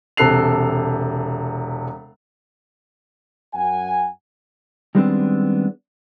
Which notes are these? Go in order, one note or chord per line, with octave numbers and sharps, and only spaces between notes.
E1 C3 A4 F#6 C7 F7
F#2 F#5 G#5
D#3 G3 G#3 B3 C4 D4